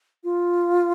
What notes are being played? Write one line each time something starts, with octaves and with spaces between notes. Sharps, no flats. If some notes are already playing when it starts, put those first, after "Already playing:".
F4